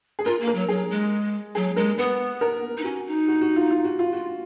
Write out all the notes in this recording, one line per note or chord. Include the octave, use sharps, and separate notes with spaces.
G#4
F4 A#4
A#3
A#4
F#3
F#3 G#4
G#3
F#3 G#4
G#3 A#4
B3 B4
A#4
D#4
C#4 F#4
D#4
F#4
F#4
F4
F4
F#4
F4
F4 F#4